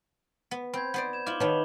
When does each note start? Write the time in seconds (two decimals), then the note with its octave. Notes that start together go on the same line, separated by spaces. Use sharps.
0.51 B3
0.73 C4 B5 G6 G#6
0.94 B3 C5 D5
1.13 G#6 E7
1.26 E4 F4 D6 F#7 G7
1.40 D#3 B3 B4 C#5 A5 B5 F7 G7